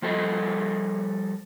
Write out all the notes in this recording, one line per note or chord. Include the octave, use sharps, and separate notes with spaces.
F3 G3 A4 D#5